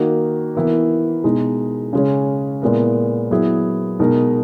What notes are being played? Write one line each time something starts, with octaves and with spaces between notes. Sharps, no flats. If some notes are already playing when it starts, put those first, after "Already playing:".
Already playing: D#3 A#3 D#4 F#4
E3 B3 E4 A#4
B2 G#3 D#4
C#3 G#3 C#4
A#2 G#3 B3 E4 A#4
F#3 B3 E4 G#4
B2 G#3 D#4 A#4